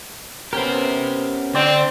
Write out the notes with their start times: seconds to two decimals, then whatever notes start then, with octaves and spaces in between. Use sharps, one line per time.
0.53 B3 C#4 G4 A#4 C5
1.55 D3 C4 D5